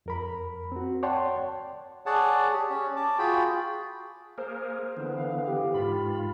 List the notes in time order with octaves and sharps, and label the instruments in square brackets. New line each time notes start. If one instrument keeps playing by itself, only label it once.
[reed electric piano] F2 A#4 B5
C4 F#4
C#5 D5 F#5 G5 A5 C6
[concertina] G#4 C#5 D5 F#5 A5
G4
C#4 C#5
A5 D6
F4 F#4 G#4 G5 B5
[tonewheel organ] A#3 G#4 A#4 [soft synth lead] C5
[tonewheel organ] D3 E3 B3
[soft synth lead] F5
[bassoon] G4
[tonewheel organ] G#2 F4 [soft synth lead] B5